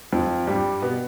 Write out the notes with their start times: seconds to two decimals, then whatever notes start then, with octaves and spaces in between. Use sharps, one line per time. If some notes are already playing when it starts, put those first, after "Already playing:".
0.12 F2 F3
0.47 G2 G3
0.82 B2 B3